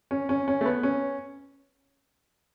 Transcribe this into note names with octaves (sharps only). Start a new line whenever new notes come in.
C#4
C#4
C#4
A3
B3
C#4